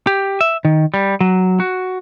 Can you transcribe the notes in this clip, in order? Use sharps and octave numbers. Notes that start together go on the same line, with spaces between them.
G4
E5
D#3
G3
F#3
F#4